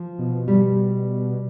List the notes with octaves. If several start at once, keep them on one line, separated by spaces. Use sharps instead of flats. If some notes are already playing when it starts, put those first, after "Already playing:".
Already playing: F3
B2
G3